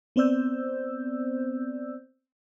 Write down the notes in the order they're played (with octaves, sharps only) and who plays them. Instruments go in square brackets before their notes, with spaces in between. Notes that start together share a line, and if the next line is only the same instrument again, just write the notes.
[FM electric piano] B3 C4 C5 D5 E6 G6